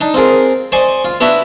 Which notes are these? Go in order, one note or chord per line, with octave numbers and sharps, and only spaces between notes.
D4 D#4
C4 F4 G#4 A#4
C5 D5 D#5 G#5 C6 C#6
F4
B3 D4 E4 F#4 E5 B5